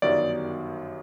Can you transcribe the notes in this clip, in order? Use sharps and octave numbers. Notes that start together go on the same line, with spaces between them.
G1 F#2 D#3 G3 D5